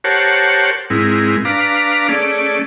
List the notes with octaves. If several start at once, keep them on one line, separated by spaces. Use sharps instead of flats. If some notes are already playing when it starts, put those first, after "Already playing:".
G4 A#4 C5 C#5 F#5 A5
G#2 G#3 C4 E4 A#4
D4 B4 F5 A#5 D6
A3 C#4 G#4 D5